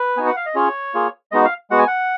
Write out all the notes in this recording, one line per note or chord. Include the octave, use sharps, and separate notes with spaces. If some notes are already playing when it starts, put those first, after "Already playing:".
Already playing: B4
B3 D#4 F#4 G#5
F#5
F5
D#5
C#4 F4 G#4 C#5
A#3 F4 G#4
G#3 B3 D#4 F#4 D#5
F5
G#3 B3 F#4 F#5
G#5
F#5